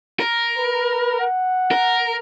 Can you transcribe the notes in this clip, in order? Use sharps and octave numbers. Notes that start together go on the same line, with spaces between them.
A#4
B4
F#5
A#4